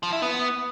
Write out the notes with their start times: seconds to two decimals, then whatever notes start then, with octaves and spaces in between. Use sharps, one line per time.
0.03 F3
0.12 E4
0.22 B3